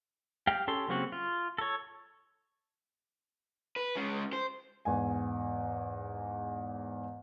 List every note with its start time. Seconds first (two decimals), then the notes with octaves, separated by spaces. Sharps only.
0.47 G4 F5 G5
0.68 C#4 G4 A4 C6
0.89 C#3 F#3 A#3 C4 F#4
1.12 F4
1.58 A4 C#5
3.76 B4
3.96 G#3 C#4
4.33 C5
4.85 E2 G#2 G#5